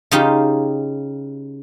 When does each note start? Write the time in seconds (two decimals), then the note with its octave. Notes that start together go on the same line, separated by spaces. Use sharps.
0.11 C#3 D#4 F4 G4